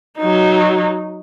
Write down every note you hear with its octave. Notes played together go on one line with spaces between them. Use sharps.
F#3 D#4